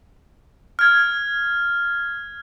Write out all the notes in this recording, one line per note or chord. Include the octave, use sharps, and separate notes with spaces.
F6 G#6